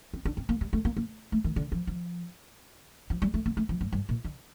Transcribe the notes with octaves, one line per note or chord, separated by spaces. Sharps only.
C4
D4
C4
A#3
G3
A3
A#3
A#3
A3
D#3
D3
F3
F3
F3
G3
A3
A#3
A3
F3
G2
G2
A#2
D3